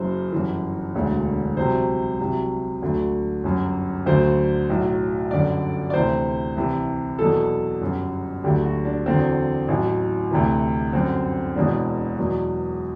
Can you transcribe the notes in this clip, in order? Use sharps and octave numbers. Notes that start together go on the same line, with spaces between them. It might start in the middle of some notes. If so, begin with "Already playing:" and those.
Already playing: F#1 F#2 F#3 C5
G1 F#2 E3
E1 D2 D3 F#3
C2 C3 F#3 C5
C2 C3 F#3
D2 D3 F#3
G1 F#2 F#3
D2 D3 F#3 C5
B1 A2 F#3
G1 F#2 D3 F#3 D5
D5
D2 C3 E3 C5
C2 C3 E3
E2 B2 F#3 A4
G1 F#2 F#3
D2 D3 F#3 G4
F#4
D4
E2 D3 F#3 C4
A1 A2 F#3
D2 C3 E3
G1 F#2 D3 C4
E1 E2 B2 D4
E2 B2 F#3